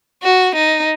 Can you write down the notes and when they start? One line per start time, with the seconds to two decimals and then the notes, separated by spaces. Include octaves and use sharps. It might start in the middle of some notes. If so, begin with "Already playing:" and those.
0.23 F#4
0.55 D#4